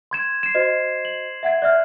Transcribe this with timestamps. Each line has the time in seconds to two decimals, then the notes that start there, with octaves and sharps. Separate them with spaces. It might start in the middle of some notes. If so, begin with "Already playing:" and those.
0.11 C6 G#6 E7
0.43 C7 E7
0.55 F#4 C5 D#5
1.05 F#7
1.43 E5 F#5 G#6
1.62 D5 E5 F6 F#6